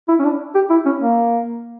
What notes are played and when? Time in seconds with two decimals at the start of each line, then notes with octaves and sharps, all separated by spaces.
0.08 E4
0.20 C#4
0.24 D4
0.55 G4
0.70 E4
0.86 C#4
1.00 A#3